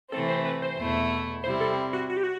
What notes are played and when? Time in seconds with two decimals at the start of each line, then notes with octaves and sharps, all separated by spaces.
0.12 C3 E3 A3 C4 A4
0.29 C5
0.45 B4
0.62 C5
0.78 E2 B2 A3 E4
1.44 C3 G3 C4 E4 C5
1.61 A4
1.93 F#4
2.10 F#4
2.17 G4
2.23 F#4